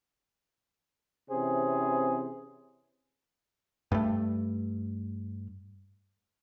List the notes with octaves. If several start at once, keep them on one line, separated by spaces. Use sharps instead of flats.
C3 E3 C4 C#4 G#4 C5
G2 A3